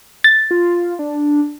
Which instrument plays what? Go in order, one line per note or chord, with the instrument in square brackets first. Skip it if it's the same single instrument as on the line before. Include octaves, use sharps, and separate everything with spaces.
[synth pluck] A6
[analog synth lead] F4
D4